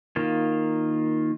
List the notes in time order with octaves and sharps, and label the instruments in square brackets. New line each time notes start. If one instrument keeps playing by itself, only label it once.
[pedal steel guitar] D#3 A#3 F4